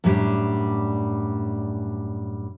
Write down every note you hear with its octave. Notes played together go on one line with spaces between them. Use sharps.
F#2 A2 G3 D4